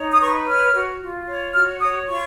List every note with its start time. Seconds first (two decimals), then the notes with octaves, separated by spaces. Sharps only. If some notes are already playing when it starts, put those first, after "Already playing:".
Already playing: D#4 C#5
0.12 D#6
0.20 B4 C#6
0.47 C#5 F6
0.74 F#4
1.01 F4
1.28 C#5
1.54 F#4 F6
1.81 C#5 D#6
2.08 F4 C#6